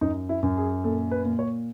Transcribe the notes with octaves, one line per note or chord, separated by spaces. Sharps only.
F#2 D#4
E4
F#2
G#4
A#2 A4
B4
A#2
C#5